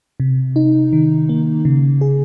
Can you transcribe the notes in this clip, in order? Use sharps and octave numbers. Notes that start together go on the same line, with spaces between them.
C3
D#4
D#3
A#3
C#3
G#4